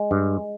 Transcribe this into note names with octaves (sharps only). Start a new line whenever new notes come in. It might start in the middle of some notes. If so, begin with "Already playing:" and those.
Already playing: G#3
G2